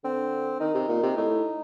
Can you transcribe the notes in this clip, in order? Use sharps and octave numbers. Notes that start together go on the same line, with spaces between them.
D3 C4
D#3 D#4
C3
A#2
C3
A2 D#4